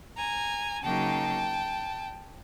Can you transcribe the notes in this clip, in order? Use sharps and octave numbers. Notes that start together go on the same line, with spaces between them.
G#5 A#5
C#3 F#3 A#3 D#4 G5 A5